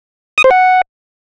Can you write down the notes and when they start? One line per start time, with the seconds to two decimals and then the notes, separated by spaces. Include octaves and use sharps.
0.38 D#6
0.44 C5
0.51 F#5